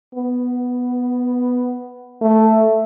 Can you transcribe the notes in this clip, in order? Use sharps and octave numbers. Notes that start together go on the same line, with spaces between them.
B3
A3